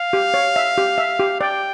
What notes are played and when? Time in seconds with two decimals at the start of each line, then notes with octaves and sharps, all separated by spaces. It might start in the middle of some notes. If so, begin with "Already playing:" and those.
Already playing: F5
0.13 G4
0.34 C#5
0.56 E5
0.78 G4
0.98 E5
1.19 G4
1.41 D5 G5